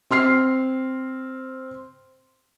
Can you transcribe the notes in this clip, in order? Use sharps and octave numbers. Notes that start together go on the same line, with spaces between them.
C4 C6 F6 C7